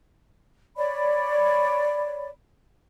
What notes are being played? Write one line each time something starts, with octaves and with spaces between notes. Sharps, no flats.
C#5 D5 B5